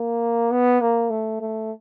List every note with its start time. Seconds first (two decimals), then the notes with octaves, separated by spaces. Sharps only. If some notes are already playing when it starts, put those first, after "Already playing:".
Already playing: A#3
0.51 B3
0.81 A#3
1.10 A3
1.41 A3